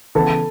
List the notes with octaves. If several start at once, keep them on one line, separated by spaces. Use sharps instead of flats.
C#3 E3 B3 E4 A4